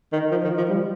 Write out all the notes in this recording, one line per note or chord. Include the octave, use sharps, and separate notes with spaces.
D#3
F3
D#3
F3
G3